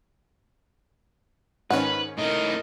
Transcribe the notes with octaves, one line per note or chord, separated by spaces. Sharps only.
G#2 D#3 C#4 B4 F#5
A2 D#4 A#4 D#5